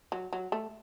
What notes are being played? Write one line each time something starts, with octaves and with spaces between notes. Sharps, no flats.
F#3
F#3
A3